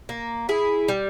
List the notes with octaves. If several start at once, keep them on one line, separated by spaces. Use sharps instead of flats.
A#3
E4 G#4
G3